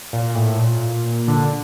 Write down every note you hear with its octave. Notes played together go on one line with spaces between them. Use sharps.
A#2
A2
A#2
D3